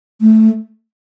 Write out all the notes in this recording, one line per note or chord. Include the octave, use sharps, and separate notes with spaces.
A3